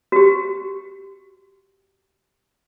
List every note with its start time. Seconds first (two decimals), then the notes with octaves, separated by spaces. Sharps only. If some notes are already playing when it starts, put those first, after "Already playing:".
0.12 F#4 G4